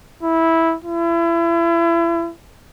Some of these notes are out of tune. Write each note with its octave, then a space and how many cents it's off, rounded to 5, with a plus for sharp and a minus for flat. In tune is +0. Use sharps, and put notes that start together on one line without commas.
E4 -10
E4 +35